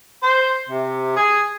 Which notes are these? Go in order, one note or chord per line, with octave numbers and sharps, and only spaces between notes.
C5
C3
G#4